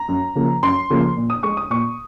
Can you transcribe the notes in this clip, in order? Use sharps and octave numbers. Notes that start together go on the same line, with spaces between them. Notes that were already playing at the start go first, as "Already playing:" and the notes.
Already playing: A#5
F#2
C#3 F3 A#3
F#2 C6
C#3 F3 A#3
A#2
D#6
G#3 C#6
D#6
A#2 C#6